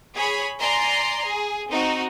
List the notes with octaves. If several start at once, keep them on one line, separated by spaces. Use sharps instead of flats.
G#4 C#5 B5
D5 G#5 A#5 C6
G#4
C4 D#4 F#4